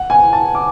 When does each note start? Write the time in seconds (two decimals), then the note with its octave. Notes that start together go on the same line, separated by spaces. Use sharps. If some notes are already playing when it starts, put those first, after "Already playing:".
Already playing: F#5
0.10 G#5
0.33 A5
0.55 D6